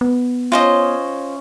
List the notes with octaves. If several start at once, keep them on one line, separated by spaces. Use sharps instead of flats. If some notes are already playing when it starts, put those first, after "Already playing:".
B3
C#4 F4 C5 C#5 D#5